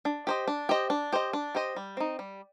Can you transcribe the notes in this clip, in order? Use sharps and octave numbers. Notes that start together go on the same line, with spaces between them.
D4
G4 C5 D#5
D4
G4 C5 D#5
D4
G4 C5 D#5
D4
G4 C5 D#5
G3
C4 D#4
G3